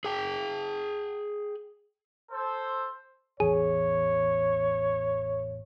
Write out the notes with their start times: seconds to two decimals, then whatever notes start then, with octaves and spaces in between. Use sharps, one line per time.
0.05 G#4 G5
2.32 A4 C5
3.40 A1 E2 G#4 C#5